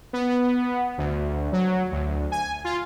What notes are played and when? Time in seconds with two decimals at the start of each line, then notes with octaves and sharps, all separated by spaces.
0.13 B3
0.98 D2
1.52 F#3
1.92 D2
2.32 G#5
2.65 F4